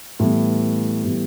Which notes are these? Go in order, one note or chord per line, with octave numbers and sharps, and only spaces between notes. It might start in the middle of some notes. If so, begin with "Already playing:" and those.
A2 E3 G3 B3
A2 E3 G3 B3